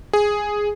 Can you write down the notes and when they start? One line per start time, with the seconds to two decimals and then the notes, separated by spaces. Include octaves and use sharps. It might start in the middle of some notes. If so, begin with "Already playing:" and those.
0.13 G#4